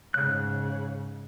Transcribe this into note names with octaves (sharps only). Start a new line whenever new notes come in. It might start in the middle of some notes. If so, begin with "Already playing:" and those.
G#2 C#3 F#6